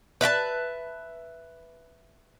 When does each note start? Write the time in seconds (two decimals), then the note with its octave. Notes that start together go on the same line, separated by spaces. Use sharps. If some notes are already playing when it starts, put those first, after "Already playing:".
0.21 B4 E5 G5 A5